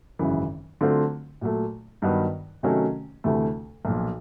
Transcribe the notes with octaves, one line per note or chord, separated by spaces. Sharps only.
G#1 F#2 C#3 E3
D3 F#3 A3 C4 F4
A#2 F#3 A3
G2 D#3 F#3 B3
C3 D#3 F#3 A3 C#4
D2 C3 E3 A3
B1 A#2 F3